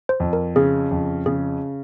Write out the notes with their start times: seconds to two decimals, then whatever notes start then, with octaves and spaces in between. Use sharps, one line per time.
0.09 C5
0.20 F2
0.33 A#4
0.56 C#3 G#4
0.91 F2
1.26 C#3 G#4